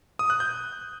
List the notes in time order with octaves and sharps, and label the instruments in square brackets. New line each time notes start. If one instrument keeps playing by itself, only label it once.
[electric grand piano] D#6
F#6
G6